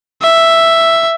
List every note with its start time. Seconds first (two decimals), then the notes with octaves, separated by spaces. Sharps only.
0.22 E5